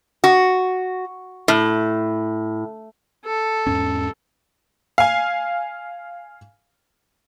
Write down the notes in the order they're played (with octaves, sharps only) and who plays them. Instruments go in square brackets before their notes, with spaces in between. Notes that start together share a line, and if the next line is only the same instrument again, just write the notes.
[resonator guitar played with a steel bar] F#4
A2
[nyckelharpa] A4
[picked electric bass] E2 G#2 C#4
[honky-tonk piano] F5 G#5